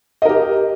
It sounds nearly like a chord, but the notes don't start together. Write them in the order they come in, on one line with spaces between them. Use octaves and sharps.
D#5 A#4 G4